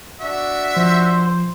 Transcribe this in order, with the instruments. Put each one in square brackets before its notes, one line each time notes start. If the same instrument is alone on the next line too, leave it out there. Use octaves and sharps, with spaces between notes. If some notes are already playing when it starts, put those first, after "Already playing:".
[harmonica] D4 F#4 E5
[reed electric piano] F3 [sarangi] C5